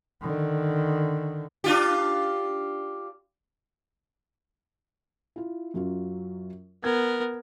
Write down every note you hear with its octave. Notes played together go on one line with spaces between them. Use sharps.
D3 D#3
D4 F4 G4
E4 F4
F#2 F#3 F4
B3 A#4 G#6